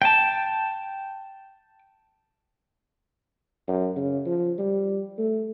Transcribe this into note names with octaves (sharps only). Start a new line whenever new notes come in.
G5 A5
F#2
C#3
F3
G3
A3